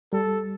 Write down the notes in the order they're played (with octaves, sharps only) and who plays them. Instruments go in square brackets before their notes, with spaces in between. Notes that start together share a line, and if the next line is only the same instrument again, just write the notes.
[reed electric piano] G3 [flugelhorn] A4